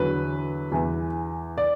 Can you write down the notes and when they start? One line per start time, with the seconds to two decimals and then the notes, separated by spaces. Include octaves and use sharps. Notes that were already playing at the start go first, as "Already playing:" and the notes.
Already playing: E2 D3 F#3 B4
0.72 E2 E3
1.58 D5